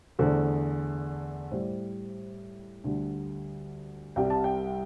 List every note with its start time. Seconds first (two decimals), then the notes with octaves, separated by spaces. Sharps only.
0.19 E2 D3 A3 C5
1.51 A2 G3 C5
2.84 D2 D3 G3
4.16 C2 C3 G3 G5
4.30 A5
4.44 G5